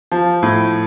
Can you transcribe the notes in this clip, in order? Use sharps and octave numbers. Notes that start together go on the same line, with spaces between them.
F3
A2